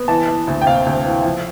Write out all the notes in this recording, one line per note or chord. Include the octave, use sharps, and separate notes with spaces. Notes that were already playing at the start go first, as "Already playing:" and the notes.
Already playing: B3
E3 A5
E3
D2
G5
C3 F5
D2
E3
F3